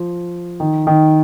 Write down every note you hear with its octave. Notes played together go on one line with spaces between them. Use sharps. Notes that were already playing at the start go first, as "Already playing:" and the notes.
Already playing: F3
D#3
D#3